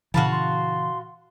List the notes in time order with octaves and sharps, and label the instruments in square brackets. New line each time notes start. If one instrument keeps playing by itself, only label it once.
[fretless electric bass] A#2 C#3 E3 [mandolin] F#4 F5 A5 [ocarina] B5
[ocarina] C6